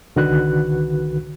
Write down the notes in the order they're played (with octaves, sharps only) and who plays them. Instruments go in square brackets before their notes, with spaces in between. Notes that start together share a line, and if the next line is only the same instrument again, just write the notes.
[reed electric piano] C2 D3 D#3 F#4 B4 F#6